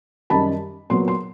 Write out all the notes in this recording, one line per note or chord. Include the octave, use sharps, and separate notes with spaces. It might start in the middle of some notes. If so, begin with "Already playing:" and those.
F#2 D#3 G3 A5 B5
A#2 F#3 B3 C6
C6